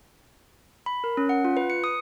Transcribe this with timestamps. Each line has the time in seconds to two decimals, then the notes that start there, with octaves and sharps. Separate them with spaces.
0.86 B5
1.04 A#4
1.17 C#4
1.29 F#5
1.45 F4
1.57 B4
1.70 C#7
1.84 D#6